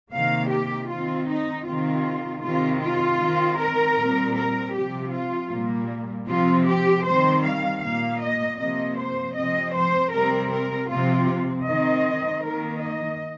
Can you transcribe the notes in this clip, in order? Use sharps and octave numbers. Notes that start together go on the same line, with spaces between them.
C3 D#3 A#3 F5
G4
D#3 C4 F4
D#4
C3 D#3 C4 F4
C3 D#3 C4 F4
F4
D#3 C4
A#4
A#2 G3 C4
A#4
C3 F3 C4 G4
F4
A#2 G3 A#3
C3 F3 C4 F4
G4
D#3 G3 C4 C5
F5
A#2 A#3 F5
D#5
C3 F3 A#3 D#5
C5
C3 F3 C4 D#5
C5
C3 G3 C4 A#4
A#4
C3 F3 C4 F4
D#3 C4 D#5
D#3 A#3 A#4
D#5